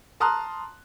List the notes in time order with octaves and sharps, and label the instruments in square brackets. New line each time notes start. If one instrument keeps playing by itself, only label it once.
[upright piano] A5 A#5 C6 D#6 F6 F#6